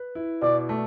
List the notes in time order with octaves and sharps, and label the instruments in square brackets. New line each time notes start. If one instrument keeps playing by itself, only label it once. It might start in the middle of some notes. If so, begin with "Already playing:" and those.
Already playing: [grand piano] B4
E4
[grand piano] B2 [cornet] D5
[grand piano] A3